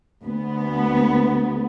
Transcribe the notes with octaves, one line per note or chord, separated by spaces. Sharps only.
D2 B3